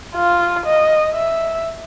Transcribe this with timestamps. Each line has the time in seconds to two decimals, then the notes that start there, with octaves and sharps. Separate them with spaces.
0.15 F4
0.66 D#5
1.13 E5